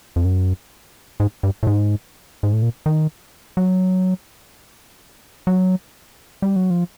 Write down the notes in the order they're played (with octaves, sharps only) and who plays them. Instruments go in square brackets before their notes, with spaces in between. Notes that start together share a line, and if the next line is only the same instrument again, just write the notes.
[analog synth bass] F2
F#2
G#2
G2
A2
G#2
G#2
A2
A#2
D#3
F#3
F#3
G3
F#3
F3